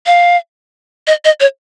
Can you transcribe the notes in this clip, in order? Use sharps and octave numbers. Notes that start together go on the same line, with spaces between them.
F5
D#5
D#5
C#5